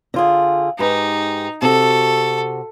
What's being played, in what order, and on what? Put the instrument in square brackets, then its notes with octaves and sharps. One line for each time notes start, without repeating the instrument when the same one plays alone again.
[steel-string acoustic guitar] D3 F4 G#4
[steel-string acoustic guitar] G#2 G4 B4 [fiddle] D#4
[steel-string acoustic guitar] C3 F#4 [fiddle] A4